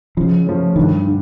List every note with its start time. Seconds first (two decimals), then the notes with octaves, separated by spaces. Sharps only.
0.17 C#3 F3
0.47 F3 A3 C#4
0.76 G2 D#3
1.07 D3